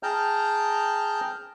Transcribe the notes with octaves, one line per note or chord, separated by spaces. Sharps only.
G#4 G5 A5 A#5 F6 G6